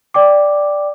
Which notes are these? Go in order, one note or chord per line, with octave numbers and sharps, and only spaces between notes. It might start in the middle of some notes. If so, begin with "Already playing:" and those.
D5 G5 D6